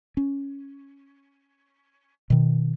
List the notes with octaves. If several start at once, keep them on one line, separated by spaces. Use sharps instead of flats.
C#4
B2 D#3